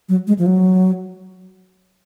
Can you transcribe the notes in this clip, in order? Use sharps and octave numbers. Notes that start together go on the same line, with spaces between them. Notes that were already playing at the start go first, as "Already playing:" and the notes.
F#3
G#3
F3
F#3